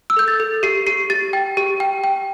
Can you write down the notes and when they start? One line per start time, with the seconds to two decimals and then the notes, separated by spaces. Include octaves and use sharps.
0.10 E6
0.16 A4 G6
0.28 A6
0.40 A4
0.63 G4 C7
0.86 G4 C7
1.10 G4 A6
1.33 G5
1.57 G4
1.80 G5
2.04 G5